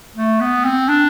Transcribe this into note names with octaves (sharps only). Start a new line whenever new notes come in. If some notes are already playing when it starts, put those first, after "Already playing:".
A3
B3
C4
D4